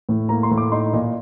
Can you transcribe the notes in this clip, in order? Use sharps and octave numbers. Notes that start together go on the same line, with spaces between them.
A2
A#3 A#5
C6
A2
D6
D#4 C6
A#2 D#5